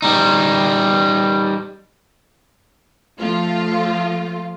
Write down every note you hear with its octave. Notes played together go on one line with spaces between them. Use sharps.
G3 D#4
F3 A3 F4